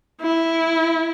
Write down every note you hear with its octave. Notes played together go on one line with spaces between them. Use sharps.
E4